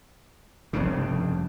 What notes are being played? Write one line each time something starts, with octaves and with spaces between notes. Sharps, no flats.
F1 G2 C#3